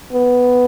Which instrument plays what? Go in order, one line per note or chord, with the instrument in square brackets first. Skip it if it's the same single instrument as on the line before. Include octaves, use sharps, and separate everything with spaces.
[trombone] B3